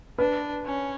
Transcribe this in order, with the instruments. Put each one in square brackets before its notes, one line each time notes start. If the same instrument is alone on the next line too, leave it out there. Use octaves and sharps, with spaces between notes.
[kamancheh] D4 [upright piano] B4
[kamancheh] C#4